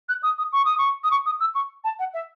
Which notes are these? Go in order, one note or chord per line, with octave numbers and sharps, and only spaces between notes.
F#6
D#6
D#6
C#6
D#6
C#6
D#6
C#6
D#6
E6
C#6
A5
F#5
E5